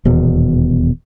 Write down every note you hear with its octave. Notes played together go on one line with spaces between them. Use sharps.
D#1 E2 B2